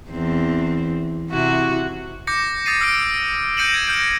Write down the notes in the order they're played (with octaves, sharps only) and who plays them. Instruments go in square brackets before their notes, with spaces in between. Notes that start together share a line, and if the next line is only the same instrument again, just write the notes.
[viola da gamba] E2 C4
C3 E4 F#4
[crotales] D6 G6 A#6 C#7
D#6 A6 C7 D#7
E6 F6 C#7 D7
G6 A#6 C#7 D#7 E7 F#7
G#6 D7
F6 G6 D7